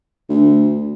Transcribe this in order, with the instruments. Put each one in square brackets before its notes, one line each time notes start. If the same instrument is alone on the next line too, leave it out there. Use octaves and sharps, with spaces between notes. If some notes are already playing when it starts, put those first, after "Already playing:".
[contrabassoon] D2